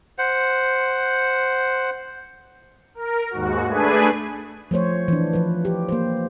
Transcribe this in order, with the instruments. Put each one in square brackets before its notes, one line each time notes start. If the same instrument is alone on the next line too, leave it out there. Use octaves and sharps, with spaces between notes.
[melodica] C5 F#5
[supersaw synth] A#4
D#2 G#2 F#4
A3 D4 G#4 B4 G#5
[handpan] F3 A3 C5 C#5
E3 D4
F3 B4
G4
A#3 C5